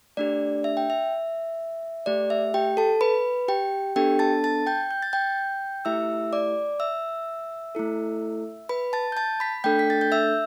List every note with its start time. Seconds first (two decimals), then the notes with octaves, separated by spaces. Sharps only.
0.17 A3 D4 G4 D5
0.64 E5
0.77 G5
0.90 E5
2.06 A3 G4 D5
2.30 E5
2.54 G4 G5
2.77 A4 A5
3.01 B4 B5
3.48 G4 G5
3.96 B3 D4 G4 A4 G5
4.19 A5 A6
4.44 A5 A6
4.67 G5 G6
4.91 G6
5.02 A6
5.13 G5 G6
5.85 A3 E4 G4 E5 E6
6.33 D5 D6
6.80 E5 E6
7.75 A3 E4 A4
8.69 B4 B5
8.93 A5 A6
9.12 G6
9.17 A5 A6
9.40 B5 B6
9.64 A3 D4 A4 G5 G6
9.79 B6
9.90 A6
10.01 G6
10.12 E5 E6